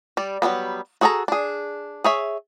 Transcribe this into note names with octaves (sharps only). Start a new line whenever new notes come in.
G3 D5
F#3 G3 A#3 B3
F#4 G#4 A4 A5 A#5
D4 G#4
G#4 C#5 E5